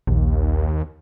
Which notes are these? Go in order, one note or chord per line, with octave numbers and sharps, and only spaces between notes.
A#1 D#2